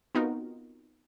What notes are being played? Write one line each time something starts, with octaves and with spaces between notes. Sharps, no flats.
B3 C4 D#4 F4 F#4 A#4